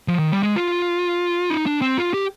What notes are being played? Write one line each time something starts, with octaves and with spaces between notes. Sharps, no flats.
F3
D#3
G3
G#3
F4
D#4
D4
C4
F4
G4